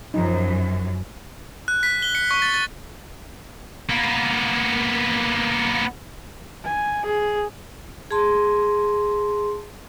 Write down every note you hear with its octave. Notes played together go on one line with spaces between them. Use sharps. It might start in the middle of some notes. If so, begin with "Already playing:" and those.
F#2 F3 D#4
F#6
B6
G7
C#7
C#6
A6
A6
A#3 B3
G#5
G#4
G#4 A5 C6